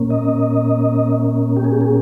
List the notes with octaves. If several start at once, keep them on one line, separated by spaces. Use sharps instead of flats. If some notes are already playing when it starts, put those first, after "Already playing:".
Already playing: A#2 A#3 C#4
D#5
G4
G#4
G4
G#4